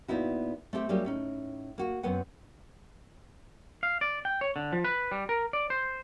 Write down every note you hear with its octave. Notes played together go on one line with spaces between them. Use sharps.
A#2 B3 D#4 E4 F#4
A3 C4 G4 E5
F#3 G3 A#3 D4 G4 G#4
A2 C#4 D#4
A#3 F#4
F#2 B3 C4 B4 F#5
F5
D5
G5
C#5
D3
F3
B4
G3
A#4
D5
C5